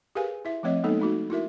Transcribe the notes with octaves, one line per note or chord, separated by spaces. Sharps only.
G4 G#4 A#4 B4 F5 G#5
E4 E5
F3 A3 C4 C#5 D#5
G#3 A#3 B3 D#4 A4
A3 D#4 F#4
E4 F#4 A#4 E5